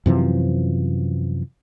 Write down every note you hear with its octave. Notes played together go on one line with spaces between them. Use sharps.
F#2 C3 E3 F3